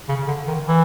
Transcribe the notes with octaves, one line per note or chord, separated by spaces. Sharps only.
C#3
D3
D#3
E3